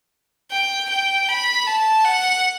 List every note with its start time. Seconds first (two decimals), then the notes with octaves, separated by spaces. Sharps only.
0.51 G5
0.90 G5
1.28 B5
1.67 A5
2.05 F#5